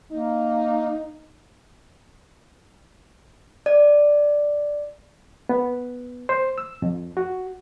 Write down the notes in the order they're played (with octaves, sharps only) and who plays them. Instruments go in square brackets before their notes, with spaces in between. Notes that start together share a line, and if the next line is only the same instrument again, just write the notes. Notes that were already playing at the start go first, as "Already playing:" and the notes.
[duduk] A#3 [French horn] D#4
[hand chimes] D5
[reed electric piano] B3
C5
E6
F2
F#4